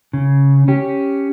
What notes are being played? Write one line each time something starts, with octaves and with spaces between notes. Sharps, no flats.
C#3
C#4 G4